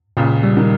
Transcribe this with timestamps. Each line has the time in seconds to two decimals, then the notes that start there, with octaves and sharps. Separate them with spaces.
0.17 C#2 A#2 C#3
0.43 G3
0.57 D#3